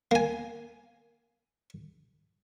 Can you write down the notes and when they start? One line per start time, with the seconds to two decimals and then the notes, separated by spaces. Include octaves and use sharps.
0.11 A#3 G#5